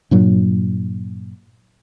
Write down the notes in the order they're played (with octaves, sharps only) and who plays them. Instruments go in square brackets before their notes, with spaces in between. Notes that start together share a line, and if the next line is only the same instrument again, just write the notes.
[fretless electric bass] G2 A#2 F#3